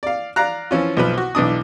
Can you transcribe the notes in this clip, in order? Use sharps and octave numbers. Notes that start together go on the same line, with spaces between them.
D5 F5
D5 F5 A#5 F#6
E3 F3 C#4 F4
B1 F3 B4
F#4
B1 E3 D4 D#6